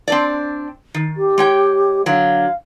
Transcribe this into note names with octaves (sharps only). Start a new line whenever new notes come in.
C4 D4 D5
D#3
G4
G#3 C#5 G5
D3 F#3 F5